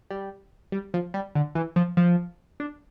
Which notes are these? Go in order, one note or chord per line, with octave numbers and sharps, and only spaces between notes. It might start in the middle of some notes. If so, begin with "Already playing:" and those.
G3
G3
F3
G3
D3
E3
F3
F3
D4